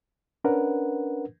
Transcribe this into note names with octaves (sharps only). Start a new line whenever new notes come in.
C#4 D4 A#4 B4 F#5